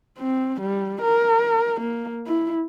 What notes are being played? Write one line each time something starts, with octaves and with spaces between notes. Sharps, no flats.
C4
G3
A#4
A#3
E4